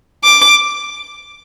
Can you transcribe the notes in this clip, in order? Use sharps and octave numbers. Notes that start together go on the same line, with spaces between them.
D6